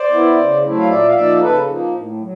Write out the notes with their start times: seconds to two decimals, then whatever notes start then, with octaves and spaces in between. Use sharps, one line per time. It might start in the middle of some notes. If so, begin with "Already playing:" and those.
Already playing: C5 D5
0.10 B3 E4
0.37 C#3
0.63 F#3 A3 C4 E4
0.78 F5
0.88 A#2 D5 E5
1.07 F5
1.15 F3 A#3 D#4 D5 E5
1.41 C#3 A4 B4
1.67 F3 A#3 D#4
1.93 A2
2.19 F#3